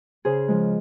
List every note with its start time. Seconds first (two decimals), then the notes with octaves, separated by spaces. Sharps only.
0.25 C#3 G#4 C5
0.48 F3 G#3